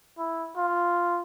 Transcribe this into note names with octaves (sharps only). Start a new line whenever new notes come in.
E4
F4